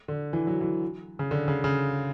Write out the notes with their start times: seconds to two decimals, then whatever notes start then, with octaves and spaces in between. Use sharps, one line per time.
0.08 D3
0.33 E3
0.47 F#3
0.61 E3
1.19 C#3
1.31 D3
1.48 C#3
1.64 C#3